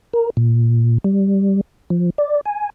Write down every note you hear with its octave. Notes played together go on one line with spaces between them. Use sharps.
A#4
A#2
G3
F3
D5
G#5